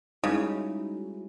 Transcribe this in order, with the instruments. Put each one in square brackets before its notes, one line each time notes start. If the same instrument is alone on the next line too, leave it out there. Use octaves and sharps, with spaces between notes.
[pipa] C#3 [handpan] G3 G#3 E4 [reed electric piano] D#4 [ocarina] F#4